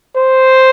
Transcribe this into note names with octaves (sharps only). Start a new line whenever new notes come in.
C5